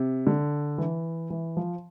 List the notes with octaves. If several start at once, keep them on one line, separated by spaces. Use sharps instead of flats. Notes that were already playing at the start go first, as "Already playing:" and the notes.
Already playing: C3
D3
E3
E3
F3